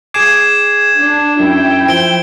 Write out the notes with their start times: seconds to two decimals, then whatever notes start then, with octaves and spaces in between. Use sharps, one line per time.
0.14 G#4 G#5 D6 G#6 C7 E7
0.98 D4
1.40 F#2 E4 G5
1.88 F3 D7 G7